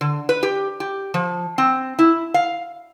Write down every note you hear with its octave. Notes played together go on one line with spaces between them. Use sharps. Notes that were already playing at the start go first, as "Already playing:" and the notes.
D3
B4
G4
G4
F3
C4
E4
F5